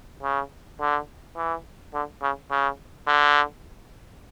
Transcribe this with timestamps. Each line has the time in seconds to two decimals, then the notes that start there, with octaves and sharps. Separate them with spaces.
0.23 C#3
0.80 D3
1.37 E3
1.94 D3
2.22 C#3
2.51 C#3
3.07 D3